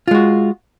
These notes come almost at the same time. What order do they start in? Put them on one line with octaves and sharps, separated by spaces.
F4 G#3 F#4